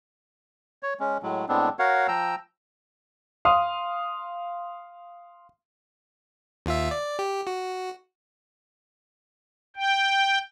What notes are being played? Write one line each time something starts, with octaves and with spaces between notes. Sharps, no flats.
C#5
G#3 C#4
A2 F#3 G#3
A2 G#3 B3 C4 D4
F#4 A#4 C#5 F5 F#5
F3 G5 A#5 E6
F5 C6 D#6
D#2 F4 E5
D5
G4
F#4
G5